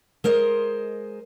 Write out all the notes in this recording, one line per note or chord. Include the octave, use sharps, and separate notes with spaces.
G#3 A#4 C5 D#5